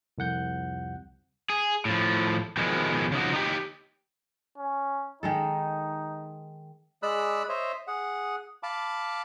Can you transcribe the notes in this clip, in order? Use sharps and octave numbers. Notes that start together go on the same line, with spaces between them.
C2 F2 F#5 G6
G#4
A2 F3
B2 D#3 F3 G#3
C#3 F3 D#4 F#4
D#4 G4
C#4
D#3 G#3 D#4 A4
G#3 G#4 D5 B5 E6 F#6
C5 C#5 D#5 E5
G#4 F#5
F5 A5 B5 D6